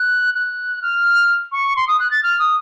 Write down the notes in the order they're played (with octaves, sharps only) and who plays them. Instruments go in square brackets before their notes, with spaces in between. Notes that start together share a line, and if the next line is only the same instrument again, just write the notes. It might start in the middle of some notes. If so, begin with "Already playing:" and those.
Already playing: [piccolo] F#6
F#6
F6
C#6
C6
D#6
F#6
A6
F6
D#6